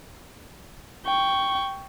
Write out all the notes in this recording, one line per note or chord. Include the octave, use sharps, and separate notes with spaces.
G5 C#6